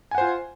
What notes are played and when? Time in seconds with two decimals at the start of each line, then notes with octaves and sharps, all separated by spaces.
0.11 G#5
0.15 F#5
0.18 C5
0.21 F4